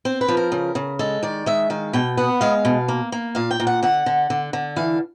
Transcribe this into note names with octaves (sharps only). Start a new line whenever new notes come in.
C4 C5
B4
F3
A#4
C#3
C#3
G#3 A4
D#3 D5
G#3 E5
D#3 F5
B2 G5
B3 F#5
G#3 F5
B2
A#3
A#3
A#2 F5
G5
A#2
F#5
D3 F#5
D3
D3
D3
E3 F5